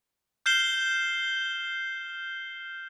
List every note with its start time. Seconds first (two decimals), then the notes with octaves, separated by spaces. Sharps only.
0.46 F6 G6 C7 E7 G7